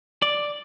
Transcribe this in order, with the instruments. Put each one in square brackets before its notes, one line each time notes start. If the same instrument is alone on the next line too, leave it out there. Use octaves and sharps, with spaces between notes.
[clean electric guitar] D5